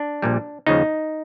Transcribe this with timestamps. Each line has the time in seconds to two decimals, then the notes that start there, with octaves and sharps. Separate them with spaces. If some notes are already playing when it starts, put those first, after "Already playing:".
Already playing: D4
0.22 A#1 A#2 G3
0.67 D#2 C#3 F3 D#4